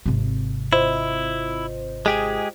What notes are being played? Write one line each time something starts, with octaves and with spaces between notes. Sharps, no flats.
G#1 C3
E4 F4 C5 D#5
G#3 G4 G#4